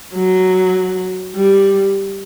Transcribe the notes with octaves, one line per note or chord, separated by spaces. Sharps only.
F#3
G3